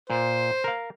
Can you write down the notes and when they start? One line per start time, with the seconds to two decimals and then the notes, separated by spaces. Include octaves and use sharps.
0.10 A#2 C5
0.64 A#4 F5